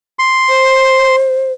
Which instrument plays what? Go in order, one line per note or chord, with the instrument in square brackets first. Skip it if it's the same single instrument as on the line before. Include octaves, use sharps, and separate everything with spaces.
[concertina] C6
[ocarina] C5